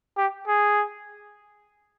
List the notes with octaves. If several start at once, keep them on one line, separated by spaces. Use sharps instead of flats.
G4
G#4